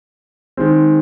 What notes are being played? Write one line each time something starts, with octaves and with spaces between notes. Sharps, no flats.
D#3 G#3 C4